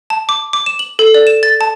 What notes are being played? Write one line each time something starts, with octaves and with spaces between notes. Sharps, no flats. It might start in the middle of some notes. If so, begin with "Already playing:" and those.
A5
D6
D6
E7
F#7
A4
D5
E7
A6
A5